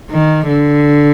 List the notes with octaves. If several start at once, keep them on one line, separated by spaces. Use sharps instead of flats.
D#3
D3